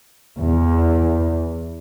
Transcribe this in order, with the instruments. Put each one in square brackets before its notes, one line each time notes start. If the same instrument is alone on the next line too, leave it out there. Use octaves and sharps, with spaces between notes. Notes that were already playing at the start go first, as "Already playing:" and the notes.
[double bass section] E2